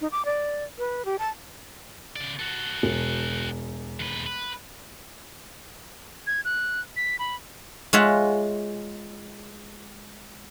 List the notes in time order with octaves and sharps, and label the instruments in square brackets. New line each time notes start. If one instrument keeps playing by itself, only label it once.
[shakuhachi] D#4
D6
D5
B4
G4
A5
[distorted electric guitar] C#3 D5
F#4 A4
[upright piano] E1
[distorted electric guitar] D#2 B4
B4
[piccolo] G#6
F#6
B6
B5
[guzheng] G#3 F4 C#5 E5 F#5